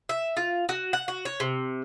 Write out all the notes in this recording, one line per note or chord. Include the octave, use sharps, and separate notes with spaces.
E5
F4
F#4
F#5
F#4
C#5
C3